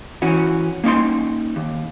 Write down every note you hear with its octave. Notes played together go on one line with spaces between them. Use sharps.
E3 C#4 F#4
A#3 C#4 D#4 C6
D#2